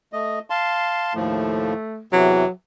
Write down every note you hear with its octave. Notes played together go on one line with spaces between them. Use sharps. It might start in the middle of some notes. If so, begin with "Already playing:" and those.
A3 D#5
F5 A5 C6
D#2 A2 F3 A3
E2 C3 E3 F#3